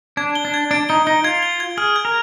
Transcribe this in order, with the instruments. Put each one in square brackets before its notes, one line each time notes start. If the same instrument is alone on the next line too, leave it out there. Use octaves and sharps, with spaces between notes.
[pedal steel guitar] D4 [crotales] G#6
[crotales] G7
[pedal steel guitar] D4
[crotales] G#6
[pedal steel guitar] D4 [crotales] D7
[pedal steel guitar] D#4 [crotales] G7
[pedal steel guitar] D#4 [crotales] G7
[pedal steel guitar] F4 [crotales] G#6
[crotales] G7
G#6
[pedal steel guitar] G#4 [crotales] F6
[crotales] G#6
[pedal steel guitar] A#4